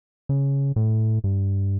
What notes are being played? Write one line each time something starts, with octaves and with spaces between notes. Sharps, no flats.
C#3
A2
G2